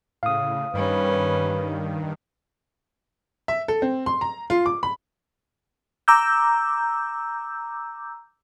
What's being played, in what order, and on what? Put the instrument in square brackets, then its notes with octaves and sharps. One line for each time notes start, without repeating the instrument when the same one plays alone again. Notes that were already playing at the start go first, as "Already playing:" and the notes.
[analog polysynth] A2 C#3 [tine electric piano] F5 D#6
[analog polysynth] G2 D#3 [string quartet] G3 C#4 [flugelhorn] B4
[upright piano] E5
A4
C4
C6
A#5
F4
D6
B5
[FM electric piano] A#5 D6 E6 G6